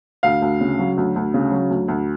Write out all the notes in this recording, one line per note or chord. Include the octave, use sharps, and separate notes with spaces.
D2 F5
D2
C#3
F#3
D2
D2
C#3
F#3
D2
D2